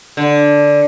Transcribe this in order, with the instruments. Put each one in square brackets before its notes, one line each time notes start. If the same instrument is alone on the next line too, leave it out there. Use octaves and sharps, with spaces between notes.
[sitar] D3